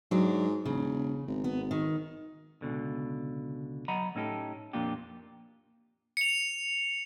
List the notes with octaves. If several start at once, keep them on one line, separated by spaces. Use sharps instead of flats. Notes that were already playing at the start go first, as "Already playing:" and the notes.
G#2 F#3 D4
E1 C#3
G#1
B3
D#3
C#2 G#2 B2 D3
F#3 D#5 F#5 A#5 B5
A2 A3 C#4 D#4 G4 A4
F2 A#2 A#3 D4 F4 G4
C#7 F7